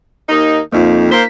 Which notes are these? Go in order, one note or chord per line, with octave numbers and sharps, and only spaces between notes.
D#2 A#3 D#4
F2 A#3 D#4 F4
A#3 C5 B6